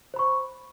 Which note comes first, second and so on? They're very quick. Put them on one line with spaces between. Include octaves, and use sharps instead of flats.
C5 B5 C#6